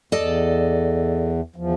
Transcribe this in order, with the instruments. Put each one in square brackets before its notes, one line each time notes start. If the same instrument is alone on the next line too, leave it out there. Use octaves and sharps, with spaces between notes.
[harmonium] E2 [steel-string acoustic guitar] A4 D5 D#5
[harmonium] E2 F3